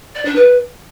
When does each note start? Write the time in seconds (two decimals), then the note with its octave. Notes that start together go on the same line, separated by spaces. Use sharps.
0.15 D5
0.25 D4
0.35 B4